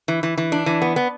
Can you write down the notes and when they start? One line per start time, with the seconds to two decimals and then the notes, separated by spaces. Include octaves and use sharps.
0.08 E3
0.23 E3
0.38 E3
0.52 D4
0.66 E3
0.82 B3
0.96 B3